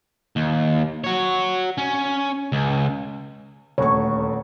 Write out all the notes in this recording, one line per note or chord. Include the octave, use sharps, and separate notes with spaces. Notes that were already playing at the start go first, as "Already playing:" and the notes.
D#2
F#4 C#5
C#4
C#2
D#1 D2 C#5 C#6